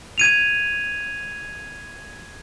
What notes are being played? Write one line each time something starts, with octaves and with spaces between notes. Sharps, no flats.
G#6 D#7 F7